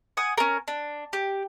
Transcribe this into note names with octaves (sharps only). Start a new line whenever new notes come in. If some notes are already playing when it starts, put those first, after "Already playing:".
F#5 G#5 D#6
C#4 A#4
D4
G4